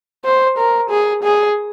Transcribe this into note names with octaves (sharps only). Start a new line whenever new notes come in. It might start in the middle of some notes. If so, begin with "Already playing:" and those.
C5
A#4
G#4
G#4